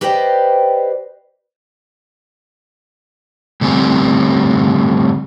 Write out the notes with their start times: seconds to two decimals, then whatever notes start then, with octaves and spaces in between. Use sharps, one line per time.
0.01 G4 B4 C5 D5 D#5 G5
3.61 A2 D3 G3 C4 G#5